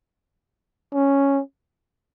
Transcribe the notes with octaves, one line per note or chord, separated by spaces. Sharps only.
C#4